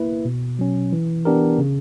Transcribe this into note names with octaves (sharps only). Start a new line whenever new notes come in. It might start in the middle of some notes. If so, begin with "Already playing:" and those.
Already playing: A#3 E4 B4
B2
F#3 C#4
E3
B3 D4 G4 A#4
C#3